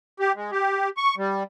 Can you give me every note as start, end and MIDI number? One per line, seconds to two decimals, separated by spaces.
0.20 0.32 67
0.36 0.51 56
0.52 0.89 67
0.97 1.15 85
1.17 1.43 55